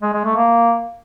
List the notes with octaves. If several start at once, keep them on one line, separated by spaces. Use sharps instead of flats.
G#3
G#3
A3
A#3